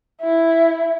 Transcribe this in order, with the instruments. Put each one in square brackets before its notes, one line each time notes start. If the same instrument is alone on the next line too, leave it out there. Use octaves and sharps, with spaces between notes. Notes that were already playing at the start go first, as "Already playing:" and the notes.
[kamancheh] E4